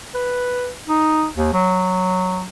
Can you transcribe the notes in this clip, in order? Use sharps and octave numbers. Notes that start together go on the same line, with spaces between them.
B4
D#4
D#2
F#3